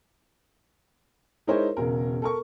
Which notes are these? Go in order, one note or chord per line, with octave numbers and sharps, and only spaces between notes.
G#3 D#4 E4 A#4 C5 C#5
E1 C#3 A#4
A4 A#4 C#6